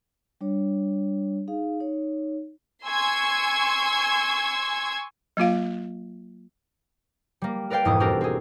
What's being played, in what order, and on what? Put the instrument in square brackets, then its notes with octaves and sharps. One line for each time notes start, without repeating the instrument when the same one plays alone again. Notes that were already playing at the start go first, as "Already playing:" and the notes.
[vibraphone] G3 D4 C#5
D#4 G#4 F5
D#4 C#5
[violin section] G#5 C6 C#6 E6 G#6
[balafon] F#3 A#3 F4 F5
[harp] G3 A#3
A#4 B4 D5 F5 G5
E1 F2 G#2 E4 D6 D#6
C4 D4 F#4 G4 A4 A#4
C4 G#4